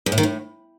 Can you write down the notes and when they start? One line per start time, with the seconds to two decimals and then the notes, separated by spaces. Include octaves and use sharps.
0.06 E2
0.12 A2
0.18 D#3
0.23 A2